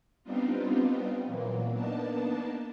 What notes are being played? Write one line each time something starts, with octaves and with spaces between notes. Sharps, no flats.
G3 B3 C4 D4 D#4 F4
A#2 E3 F#3 A#3
A#3 B3 D4 D#4 A5